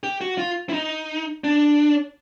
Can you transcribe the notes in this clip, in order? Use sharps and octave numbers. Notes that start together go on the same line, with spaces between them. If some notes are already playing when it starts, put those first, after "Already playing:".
G4
F#4
F4
E4
D#4
D4